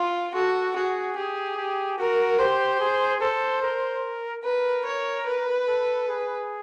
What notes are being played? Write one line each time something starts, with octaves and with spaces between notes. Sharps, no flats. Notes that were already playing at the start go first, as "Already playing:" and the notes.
Already playing: F4
F#4 A4
F#4 G#4
G4 G#4
G4
F#4 A#4
G4 C5
G#4
A4 C5
A#4
A#4 B4
C#5
B4
A4
G#4